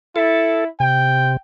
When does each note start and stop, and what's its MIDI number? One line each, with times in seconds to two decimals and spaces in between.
0.16 0.68 64
0.16 0.64 69
0.80 1.37 48
0.80 1.37 79